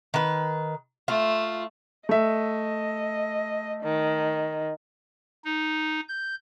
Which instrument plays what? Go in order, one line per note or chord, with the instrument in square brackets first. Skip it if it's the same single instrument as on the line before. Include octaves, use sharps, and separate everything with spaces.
[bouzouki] D#3 B4
[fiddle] A3 [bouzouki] F4
[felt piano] A3 E5 [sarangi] D#5
[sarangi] D#3
[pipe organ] D#4
G6